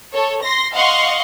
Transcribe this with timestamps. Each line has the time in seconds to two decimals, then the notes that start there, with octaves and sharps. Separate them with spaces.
0.13 A4 C#5
0.42 C6 A#6
0.73 D#5 F5 F#5 C6 C#6